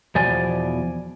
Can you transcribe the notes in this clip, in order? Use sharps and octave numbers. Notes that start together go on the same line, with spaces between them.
E2 B2 F3 D5 G#5